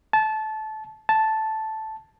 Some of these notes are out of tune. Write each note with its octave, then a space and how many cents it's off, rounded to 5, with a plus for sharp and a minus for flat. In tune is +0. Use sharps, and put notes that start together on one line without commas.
A5 -20
A5 -5